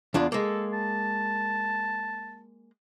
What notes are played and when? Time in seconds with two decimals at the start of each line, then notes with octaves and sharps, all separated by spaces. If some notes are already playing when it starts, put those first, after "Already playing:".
0.14 E2 D4 F4 G#4
0.32 G#3 A#3 A4
0.73 A5